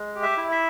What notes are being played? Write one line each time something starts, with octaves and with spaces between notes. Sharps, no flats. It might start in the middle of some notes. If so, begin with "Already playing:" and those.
Already playing: G#3
G4
E5
E4
E5